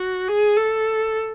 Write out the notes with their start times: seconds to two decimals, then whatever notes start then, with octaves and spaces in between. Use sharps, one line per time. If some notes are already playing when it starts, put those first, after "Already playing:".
Already playing: F#4
0.28 G#4
0.57 A4